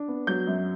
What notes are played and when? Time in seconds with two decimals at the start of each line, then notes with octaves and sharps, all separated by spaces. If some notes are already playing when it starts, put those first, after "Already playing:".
Already playing: D4
0.08 B3
0.27 F#3 G6
0.47 F#2